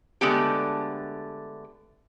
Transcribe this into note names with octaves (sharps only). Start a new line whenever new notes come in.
D3 G#3 A3 B3 G4